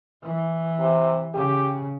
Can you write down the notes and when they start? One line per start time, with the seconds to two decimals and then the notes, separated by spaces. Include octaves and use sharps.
0.23 E3
0.79 C3
1.34 C#3 G4